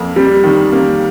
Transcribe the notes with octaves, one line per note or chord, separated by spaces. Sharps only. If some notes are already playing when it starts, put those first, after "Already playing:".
Already playing: F2 A#3
G3
D#3
A#3